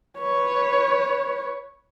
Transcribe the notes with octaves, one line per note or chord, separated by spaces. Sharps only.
B4 C#5